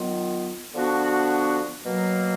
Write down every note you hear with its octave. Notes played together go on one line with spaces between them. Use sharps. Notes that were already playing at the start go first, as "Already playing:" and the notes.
Already playing: D#3 F#3 B3 F4
D3 F3 B3 D4 F#4
B2 F#3 A#3